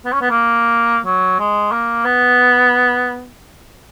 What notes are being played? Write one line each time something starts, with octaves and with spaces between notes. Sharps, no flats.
B3
C#4
B3
A#3
F#3
G#3
A#3
B3